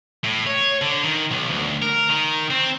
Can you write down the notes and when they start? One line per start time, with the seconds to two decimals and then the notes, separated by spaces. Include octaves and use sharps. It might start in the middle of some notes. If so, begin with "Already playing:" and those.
0.24 A2
0.47 C#5
0.82 D3
1.04 D#3
1.31 B1
1.51 D2
1.82 A#4
2.09 D#3
2.50 C4